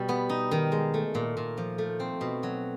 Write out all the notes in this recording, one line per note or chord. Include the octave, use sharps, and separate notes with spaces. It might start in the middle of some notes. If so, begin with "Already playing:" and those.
Already playing: B2 G3
B3
D#4
D#3
G#3
A3
A#2
A#2
F3
A3
C4
B2
F#3